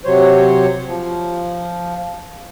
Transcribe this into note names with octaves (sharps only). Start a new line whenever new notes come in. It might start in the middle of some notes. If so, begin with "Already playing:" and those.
C3 F#3 C5 C#5
F3